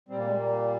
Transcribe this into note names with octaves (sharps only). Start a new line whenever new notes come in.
A#2 G3 C4
A#3
G#3
A#3